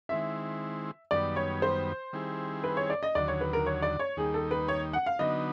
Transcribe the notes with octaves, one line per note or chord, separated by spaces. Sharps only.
D#3 G#3 C4 E4 E5
F#2 D#3 G3 B3 D5
C#5
C5
D#3 G3 C4 E4 G#4
B4
C#5
D5
D#5
D#2 D3 F#3 D5
C#5
B4
A#4
C#5
D5
C#5
D#2 D#3 G3 A#3 D#4 G#4
A4
B4
C#5
F#5
F5
D3 F#3 B3 D#4 D#5